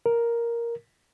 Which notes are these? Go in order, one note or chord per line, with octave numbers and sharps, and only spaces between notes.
A#4